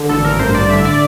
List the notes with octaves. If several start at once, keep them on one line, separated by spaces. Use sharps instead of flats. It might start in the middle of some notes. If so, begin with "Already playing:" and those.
Already playing: D3
A1 A4
A1 A#4
G2 C5
A1 D5
D3 E5
D5